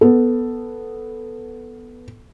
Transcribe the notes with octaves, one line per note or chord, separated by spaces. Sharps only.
B3 A4